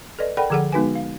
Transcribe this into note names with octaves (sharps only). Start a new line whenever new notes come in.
A4 B4 D5 D#5
A4 A#4 D5 F#5 G5 B5
D3 F3 G#4 A4 F#5
G#3 B3 D#4 F#4 B4 G#5
F5